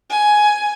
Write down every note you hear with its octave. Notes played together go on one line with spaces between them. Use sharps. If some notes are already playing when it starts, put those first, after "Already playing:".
G#5